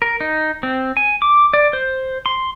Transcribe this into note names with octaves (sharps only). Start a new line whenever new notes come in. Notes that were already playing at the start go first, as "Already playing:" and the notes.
A#4
D#4
C4
G#5
D6
D5
C5
C6